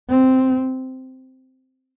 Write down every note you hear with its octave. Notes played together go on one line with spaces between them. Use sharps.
C4